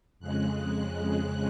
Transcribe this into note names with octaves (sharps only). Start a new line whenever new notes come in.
F2 C#3 G#3 F#6